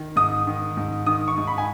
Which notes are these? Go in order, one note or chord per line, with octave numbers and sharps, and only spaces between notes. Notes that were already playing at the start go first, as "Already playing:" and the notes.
Already playing: D#3
G#2 D#6
D#3
G#2
D#3 D#6
C#6
G#2
B5
G#5